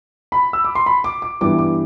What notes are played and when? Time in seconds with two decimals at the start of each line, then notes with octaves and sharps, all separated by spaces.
0.32 B5
0.53 E6
0.65 D6
0.75 C6
0.86 B5
1.04 D6
1.22 D6
1.41 G2 E3 G3 B3 D6
1.59 D6